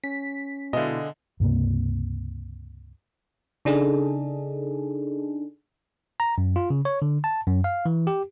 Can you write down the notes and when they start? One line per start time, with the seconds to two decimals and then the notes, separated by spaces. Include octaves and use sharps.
0.04 C#4 B6
0.73 B2 D3 G#3 E4 D#5 F5
1.40 C#2 G2 C3 A#3
3.65 C#3 D4 D#4 G#4 A4
6.20 A#5
6.38 F#2
6.56 F4
6.70 C#3
6.85 C#5
7.02 D3
7.24 A5
7.46 F#2
7.64 F5
7.86 E3
8.07 G4